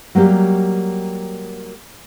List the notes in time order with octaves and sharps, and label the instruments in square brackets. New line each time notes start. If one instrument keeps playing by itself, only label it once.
[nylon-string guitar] F#3 G3 A#3 G4